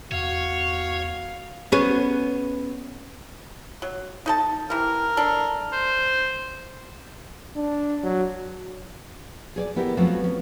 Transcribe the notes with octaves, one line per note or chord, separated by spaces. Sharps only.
E2 F#4 C#5 F5
B3 C#4 G#4
F#3
D#4 A4 A5
C3 E3 A#4
D4 A4
C5
D4
F#3
G#4 C#5 D5
B3 E4 G4 A#4
F3 F#3 A3 B3 C4
C#4